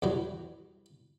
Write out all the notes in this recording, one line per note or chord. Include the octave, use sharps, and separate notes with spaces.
E2 F#3 G3